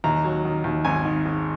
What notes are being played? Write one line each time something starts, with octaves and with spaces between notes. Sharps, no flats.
D#2 A#5
F#3
D#3
D#2
G#1 G#5
D#3
G#2